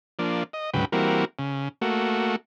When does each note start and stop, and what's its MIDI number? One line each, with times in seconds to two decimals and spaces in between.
0.19 0.43 53
0.19 0.43 58
0.19 0.43 62
0.53 0.70 75
0.74 0.85 38
0.74 0.85 44
0.74 0.85 49
0.74 0.85 54
0.74 0.85 71
0.74 0.85 79
0.92 1.25 52
0.92 1.25 55
0.92 1.25 58
0.92 1.25 60
0.92 1.25 66
0.92 1.25 70
1.39 1.69 49
1.82 2.36 57
1.82 2.36 58
1.82 2.36 66